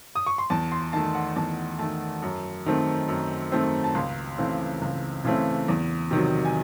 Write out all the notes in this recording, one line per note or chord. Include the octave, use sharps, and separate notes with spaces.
D#6
C#6
C6
E2 A5
C6
D#3 A3 A5
F#5
E2 A5
D#3 A3 A5
F#2
D#3 A3 C4
F#2
D#3 A3 C4
A5
C#2 C6
C#3 E3 A3 C4
C#2
C#3 E3 A3 C4
E2
C3 D#3 F#3
G#5